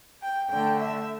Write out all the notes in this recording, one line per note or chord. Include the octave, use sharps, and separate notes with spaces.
G5
D3 A3 D4 G5
E5